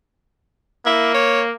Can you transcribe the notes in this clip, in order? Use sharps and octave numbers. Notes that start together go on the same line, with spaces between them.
A#3 E4
C#5